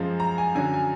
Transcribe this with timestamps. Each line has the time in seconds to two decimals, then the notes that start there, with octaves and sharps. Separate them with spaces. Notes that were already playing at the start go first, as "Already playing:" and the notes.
Already playing: F#2 F3 G#3
0.20 A#5
0.38 G#5
0.55 F#2 D3 F#3 G#5
0.74 G#5